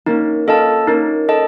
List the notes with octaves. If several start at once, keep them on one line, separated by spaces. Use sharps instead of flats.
A#3 C#4 D#4
C#4 F4 A4 D#5 A5
A#3 C#4 D#4
A4 D#5 A5